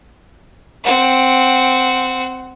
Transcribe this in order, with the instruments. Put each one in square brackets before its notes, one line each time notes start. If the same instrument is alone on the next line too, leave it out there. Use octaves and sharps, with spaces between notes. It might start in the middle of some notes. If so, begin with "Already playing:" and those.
[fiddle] C4 F#5